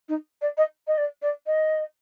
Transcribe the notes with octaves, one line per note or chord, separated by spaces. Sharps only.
D#4
D5
D#5
D#5
D5
D5
D#5